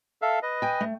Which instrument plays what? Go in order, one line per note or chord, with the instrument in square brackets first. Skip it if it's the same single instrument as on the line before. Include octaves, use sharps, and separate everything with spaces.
[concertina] A4 E5 F5
B4 D#5
[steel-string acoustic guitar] G5 G#5
A3